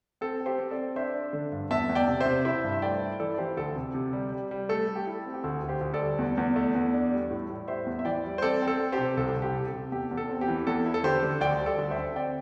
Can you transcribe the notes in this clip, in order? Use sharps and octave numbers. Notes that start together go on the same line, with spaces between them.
C4 A4
C4
G4 C5
C4
A4 D5
C4
D4 C5 E5
D4
D3
G2
E2 E5 A5
E2
D5 G5
C3
C5 E5
C3
E4 C5 E5
G2
E5
A3 D5 G5
E4
E3 A4 D5
D5
E3 G4 C5
D2 A4
C3
C3
G3
G3
G3
A3 A4
A3
G4
E4 A4
C4
G4
D2 A4
D2
G4 C5
D2
A4 D5
G3
E2
E2
A3
E2
D4
G3
A2
A2
G3 C5 E5
E2
E5
E3 D5 G5
G3
C5
C4 A4 D5
C4
A4
C4
G4 C5
C3
C2 A4
C2
G4
C3
A4
C3
E2 G4
E2
A4
C4
G4
E3
E2 A4
E4
A4
D3 G4 C5
D3
D2 D5 G5
G3
A4 D5
D2
C5 E5
D3
C4 D5 G5